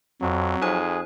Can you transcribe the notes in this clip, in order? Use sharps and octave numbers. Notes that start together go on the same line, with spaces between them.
F2 F#3
F2 D#4 G#4 C5